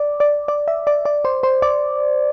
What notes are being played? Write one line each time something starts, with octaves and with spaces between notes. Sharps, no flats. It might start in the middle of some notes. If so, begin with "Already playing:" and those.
Already playing: D5
D5
D5
E5
D5
D5
C5
C5
D5